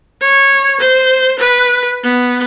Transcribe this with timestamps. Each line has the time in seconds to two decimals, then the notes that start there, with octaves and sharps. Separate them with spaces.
0.21 C#5
0.80 C5
1.39 B4
2.03 B3